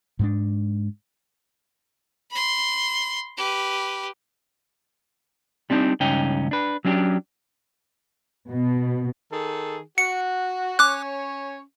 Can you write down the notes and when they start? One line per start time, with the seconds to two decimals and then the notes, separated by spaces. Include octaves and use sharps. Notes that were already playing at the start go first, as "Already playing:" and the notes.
0.19 G#2 G#3 D4
2.31 B5 C6
3.37 G4 B4
5.70 G3 C4 D4 D#4
6.00 C#2 G2 C#4 D#4 G5
6.51 D4 B4
6.85 F#3 C#4 D4 G4
8.49 B2
9.33 D#3 G#4 A4
9.98 F#4 C#7
10.79 C#4 C#5 D6 F#6